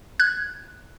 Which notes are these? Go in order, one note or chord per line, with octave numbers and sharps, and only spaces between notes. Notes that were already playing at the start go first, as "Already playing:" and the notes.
F#6 G#6